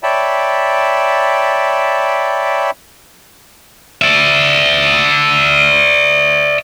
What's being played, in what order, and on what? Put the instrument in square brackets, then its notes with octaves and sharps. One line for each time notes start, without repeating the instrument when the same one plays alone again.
[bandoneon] C#5 D5 E5 G5 A5 B5
[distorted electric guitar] D5 E5